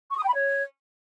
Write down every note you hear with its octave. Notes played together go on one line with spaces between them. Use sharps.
C#6
D#6
G5
B5
C#5